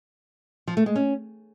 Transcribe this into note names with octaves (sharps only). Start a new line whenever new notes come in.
F3
A3
G#3
C#4